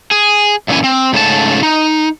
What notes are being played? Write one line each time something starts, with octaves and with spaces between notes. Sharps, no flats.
G#4
F#2 A#2 D3 E3 C#4 G#5
C4
G#2 C#3 A3 C#4 A4 A5
D#4